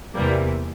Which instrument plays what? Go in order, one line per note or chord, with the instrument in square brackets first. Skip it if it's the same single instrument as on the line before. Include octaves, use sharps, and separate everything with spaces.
[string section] E2 C3 E3 G3 A#3